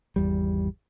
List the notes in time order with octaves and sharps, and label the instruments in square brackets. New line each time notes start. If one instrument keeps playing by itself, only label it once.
[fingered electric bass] G#1 E2 G3